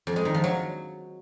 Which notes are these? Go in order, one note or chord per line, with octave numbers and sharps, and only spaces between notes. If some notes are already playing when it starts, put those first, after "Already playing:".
F2
G#3
D#3
F3
F#3